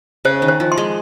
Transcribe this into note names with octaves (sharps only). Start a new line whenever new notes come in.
C#3 C5
D#3
C5
F3
C6
G#3